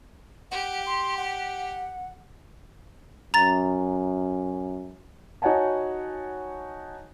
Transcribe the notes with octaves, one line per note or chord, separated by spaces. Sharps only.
G4 F#5
C6
F#5
F#2 A#5 A6
D#4 F#4 C#5 F#5 G#5 A5